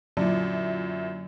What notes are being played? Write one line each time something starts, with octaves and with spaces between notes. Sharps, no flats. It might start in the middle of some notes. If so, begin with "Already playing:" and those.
F#2 A#2 D3 F#3 E4 D5